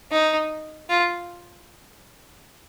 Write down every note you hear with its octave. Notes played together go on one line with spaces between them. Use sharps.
D#4
F4